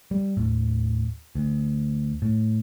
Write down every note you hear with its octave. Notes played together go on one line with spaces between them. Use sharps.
G3
D#2 A2
D2
A2